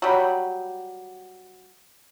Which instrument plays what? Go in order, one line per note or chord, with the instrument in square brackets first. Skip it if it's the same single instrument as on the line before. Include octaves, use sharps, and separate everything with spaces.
[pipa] F#3 G3 B5